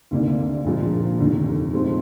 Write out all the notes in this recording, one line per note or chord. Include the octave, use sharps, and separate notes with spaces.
D2 C3 D#3 A#3 D4
A#1 A#2 F3 G#3
F1 D#2 D3
F2 D#3 G#3 C4 F4